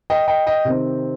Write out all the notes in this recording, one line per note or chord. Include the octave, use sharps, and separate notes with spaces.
D#5 G5
D#5 G5
D#5 G5
C3 D#3 C4